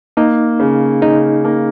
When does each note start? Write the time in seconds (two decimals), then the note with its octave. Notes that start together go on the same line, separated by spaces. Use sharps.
0.17 A#3 D#4
0.59 C#3
1.02 C#3 D#4
1.45 A#3